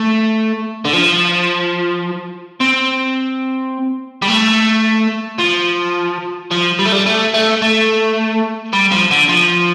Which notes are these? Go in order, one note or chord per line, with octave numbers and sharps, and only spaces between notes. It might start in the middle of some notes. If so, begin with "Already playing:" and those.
Already playing: A3
D3
F3
C4
G3
A3
F3
F3
G3
A3
G3
A3
A3
A3
G3
F3
D3
F3